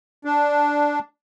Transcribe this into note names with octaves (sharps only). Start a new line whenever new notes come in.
D4